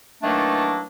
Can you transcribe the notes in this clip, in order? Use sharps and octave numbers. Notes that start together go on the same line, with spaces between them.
D#3 E3 F#3 A3 A#3 D4